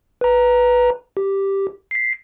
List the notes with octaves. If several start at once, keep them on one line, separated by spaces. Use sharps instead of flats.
B4 A#5
G4
B6 C7